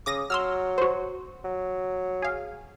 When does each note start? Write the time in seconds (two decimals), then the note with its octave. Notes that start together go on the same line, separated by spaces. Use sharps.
0.06 C#3 D6 D#6 A#6
0.30 F#3 C6 E6 F6
0.78 F#4 C5
1.44 F#3
2.22 G#4 F5